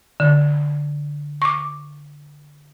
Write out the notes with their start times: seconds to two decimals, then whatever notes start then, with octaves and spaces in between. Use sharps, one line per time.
0.20 D3
1.42 C#6 D6